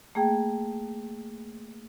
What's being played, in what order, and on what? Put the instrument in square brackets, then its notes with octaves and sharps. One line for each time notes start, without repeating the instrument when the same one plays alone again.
[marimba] A3 A#3 G#4 G5